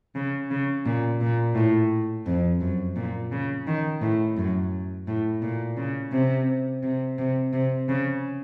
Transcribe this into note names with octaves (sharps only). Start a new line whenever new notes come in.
C#3
C#3
A#2
A#2
A2
F2
F#2
A#2
C#3
D#3
A2
F#2
A2
A#2
C#3
C3
C3
C3
C3
C#3